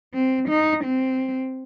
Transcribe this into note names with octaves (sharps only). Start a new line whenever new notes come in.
C4
D#4
C4